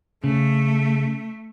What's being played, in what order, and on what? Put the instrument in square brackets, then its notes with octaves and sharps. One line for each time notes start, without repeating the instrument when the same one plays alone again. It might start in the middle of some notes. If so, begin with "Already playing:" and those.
[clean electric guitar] C#3 [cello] A3